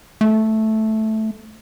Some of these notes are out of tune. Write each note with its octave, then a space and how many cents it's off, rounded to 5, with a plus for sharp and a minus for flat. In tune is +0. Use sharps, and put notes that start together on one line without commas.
A3 -5